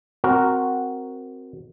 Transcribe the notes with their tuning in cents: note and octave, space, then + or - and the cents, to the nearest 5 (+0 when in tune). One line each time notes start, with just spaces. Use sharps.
C4 +0 F#4 +0 A#4 +0